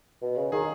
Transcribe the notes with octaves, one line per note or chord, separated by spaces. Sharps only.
B2
C#3
D#3 G#4